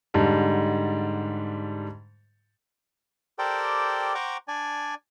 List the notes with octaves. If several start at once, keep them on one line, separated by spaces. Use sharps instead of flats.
G#2 D3 G3 A5
G4 A4 A#4 C5 D5 G5
C5 F#5 G5 A#5 C#6 D6
D4 D5 G#5